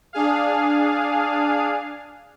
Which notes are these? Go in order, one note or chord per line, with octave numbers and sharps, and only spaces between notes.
D4 G#4 F5